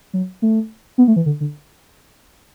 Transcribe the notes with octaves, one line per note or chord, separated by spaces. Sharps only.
F#3
A3
B3
A3
E3
D3
D3